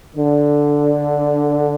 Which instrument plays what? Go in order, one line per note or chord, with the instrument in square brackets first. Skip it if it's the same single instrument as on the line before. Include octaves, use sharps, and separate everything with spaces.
[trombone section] D3